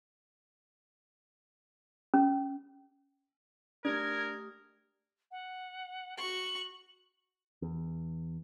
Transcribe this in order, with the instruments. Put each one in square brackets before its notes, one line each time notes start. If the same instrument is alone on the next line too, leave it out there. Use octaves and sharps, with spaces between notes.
[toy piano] C#4
[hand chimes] A3 G4 D#6 [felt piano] D4 [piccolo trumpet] A#4 [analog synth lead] G#6
[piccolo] F#5
[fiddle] F#4 C#6 [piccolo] F#7
[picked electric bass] E2